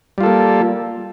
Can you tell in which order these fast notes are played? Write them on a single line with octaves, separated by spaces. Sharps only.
G3 F4 A4 A#3